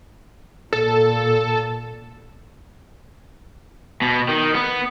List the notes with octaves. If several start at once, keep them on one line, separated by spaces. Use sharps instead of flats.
A#2 A4
B2
D#3
B3